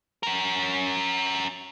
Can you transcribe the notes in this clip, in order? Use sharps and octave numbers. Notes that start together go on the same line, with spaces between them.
C#4 A#4